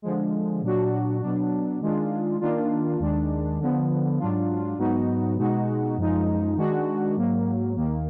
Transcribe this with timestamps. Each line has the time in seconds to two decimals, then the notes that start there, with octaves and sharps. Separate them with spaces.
0.02 D3 F3 G#3
0.62 A#2 F#3 D4 F#4
1.21 B2 F#3 D4
1.81 D#3 G#3 D4 F4
2.41 D#3 A#3 D4 F4
2.99 D#2 D#3 G#3 D4
3.59 D3 F3 B3
4.19 G#2 F#3 D4 F4
4.78 G#2 F#3 B3 D#4 F#4
5.38 B2 G#3 D#4 F#4
5.97 F#2 F3 G#3 D#4
6.56 D#3 G#3 D4 F#4
7.16 G#2 F#3 A#3
7.76 D#2 D#3 A#3